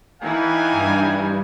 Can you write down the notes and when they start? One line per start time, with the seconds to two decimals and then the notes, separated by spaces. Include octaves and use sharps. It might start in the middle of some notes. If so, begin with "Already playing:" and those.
0.22 E3 D#4 E4 F5 G5 G#5
0.72 G2